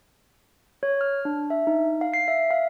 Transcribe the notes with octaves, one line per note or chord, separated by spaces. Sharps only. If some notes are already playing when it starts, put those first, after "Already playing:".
C#5
F6
D4
E5
D#4
F5
C7
E5
F5